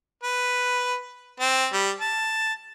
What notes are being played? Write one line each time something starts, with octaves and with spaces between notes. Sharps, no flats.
B4
C4
G3
A5